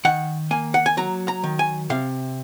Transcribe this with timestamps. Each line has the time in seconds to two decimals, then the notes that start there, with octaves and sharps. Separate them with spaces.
0.05 D#3 F#5
0.51 A#3 G#5
0.74 F#5
0.86 G#5
0.97 F#3 A#5
1.28 A#5
1.44 D#3
1.59 G#5
1.90 C3 F5